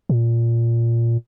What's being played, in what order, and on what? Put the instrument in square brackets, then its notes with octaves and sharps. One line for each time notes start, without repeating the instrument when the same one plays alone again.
[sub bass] A#2